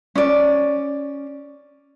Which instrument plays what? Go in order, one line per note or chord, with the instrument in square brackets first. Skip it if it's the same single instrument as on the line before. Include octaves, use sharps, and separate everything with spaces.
[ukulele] C#4 D5